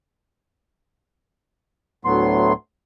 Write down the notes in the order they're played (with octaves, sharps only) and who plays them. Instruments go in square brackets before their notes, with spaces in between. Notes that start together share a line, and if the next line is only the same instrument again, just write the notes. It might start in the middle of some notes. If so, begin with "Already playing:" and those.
[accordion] D2 A2 F#3 B3 C6